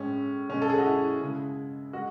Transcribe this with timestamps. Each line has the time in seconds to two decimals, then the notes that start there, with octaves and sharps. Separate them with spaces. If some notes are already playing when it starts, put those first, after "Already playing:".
Already playing: A2 G#3 C#4
0.49 B2 G#3 C#4
0.62 A4
0.70 G#4
0.78 F#4
0.85 E4
1.21 C#3 G#3
1.93 G#3 F#4